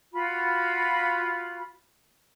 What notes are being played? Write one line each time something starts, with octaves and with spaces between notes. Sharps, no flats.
F4 F#4 B5